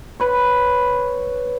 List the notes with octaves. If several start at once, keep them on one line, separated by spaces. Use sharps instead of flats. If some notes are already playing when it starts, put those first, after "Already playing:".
B4 C#5